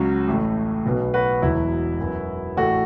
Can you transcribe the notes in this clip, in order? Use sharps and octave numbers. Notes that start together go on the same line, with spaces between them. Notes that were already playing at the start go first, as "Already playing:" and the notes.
Already playing: C#2 C#3 F#3 C#4
A1 A2 A3
B1 B2 B3
F#4 B4
E1 E2 B2 F#3 E4
F#2 F#3 B3
A1 A2 A3 F#4